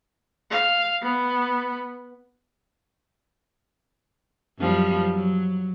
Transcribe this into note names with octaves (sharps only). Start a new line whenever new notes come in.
F5
B3
F#2 F3 G3
F#3